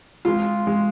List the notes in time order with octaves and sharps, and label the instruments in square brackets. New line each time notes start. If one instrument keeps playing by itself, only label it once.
[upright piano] G#3 [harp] F4
[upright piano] G#3